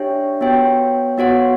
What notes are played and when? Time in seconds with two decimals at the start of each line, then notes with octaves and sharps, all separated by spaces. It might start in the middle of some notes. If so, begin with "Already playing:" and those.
Already playing: D4 G4 C#5 E5 G5
0.41 B3 F#4 C#5 G5
1.18 B3 F#4 C#5 F#5